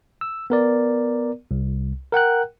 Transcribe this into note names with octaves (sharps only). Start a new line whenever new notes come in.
E6
B3 A#4 D5
C2
A#4 F#5 G5 F#6